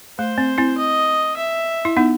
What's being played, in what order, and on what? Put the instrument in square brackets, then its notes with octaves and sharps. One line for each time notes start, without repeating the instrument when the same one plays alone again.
[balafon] A3 [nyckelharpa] C5
[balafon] C4
C4 E4
[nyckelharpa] D#5
E5
[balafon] E4
B3 D#4